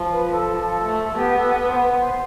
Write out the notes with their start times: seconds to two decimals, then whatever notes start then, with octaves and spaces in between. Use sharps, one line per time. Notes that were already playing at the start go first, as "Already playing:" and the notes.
Already playing: F3
0.11 B4
0.31 A4
0.53 F3
0.84 A3
1.04 A4
1.15 B3 G4
1.36 A4
1.57 B4
1.68 C5
1.78 B4
1.99 C5